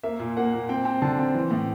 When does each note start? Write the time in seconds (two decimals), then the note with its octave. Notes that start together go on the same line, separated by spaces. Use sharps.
0.03 A#3 E5
0.19 A#2
0.37 A#3 F#5
0.53 A#2
0.69 C4 G5
0.85 C4
1.02 D3 A5
1.19 C4
1.34 E3
1.51 A2